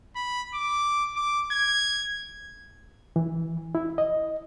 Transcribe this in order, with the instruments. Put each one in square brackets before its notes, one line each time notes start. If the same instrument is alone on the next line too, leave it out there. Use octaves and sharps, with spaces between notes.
[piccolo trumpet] B5
D6
D6
G#6
[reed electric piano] E3
E4
D#5